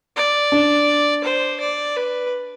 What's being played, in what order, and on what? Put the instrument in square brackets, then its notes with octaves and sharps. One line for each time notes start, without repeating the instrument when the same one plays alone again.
[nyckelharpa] D5
[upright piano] D4
[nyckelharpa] C5
D5
B4